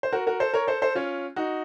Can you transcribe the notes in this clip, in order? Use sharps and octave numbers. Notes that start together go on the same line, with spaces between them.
C5
F#4 A#4
F#4 A#4
A4 C5
A#4 C#5
A4 C5
A4 C5
C#4 F4
D#4 F#4